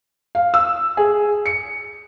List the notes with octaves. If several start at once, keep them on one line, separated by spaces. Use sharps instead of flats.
F5
E6
G#4
C#7